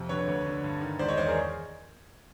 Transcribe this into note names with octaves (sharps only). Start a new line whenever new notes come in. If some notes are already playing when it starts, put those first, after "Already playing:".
Already playing: F2 C3
D3 B4 C#5
D2
D3
G2
D#3
E1 C5 D5
C#5 D#5
E2 C5 D5
G#4 A#4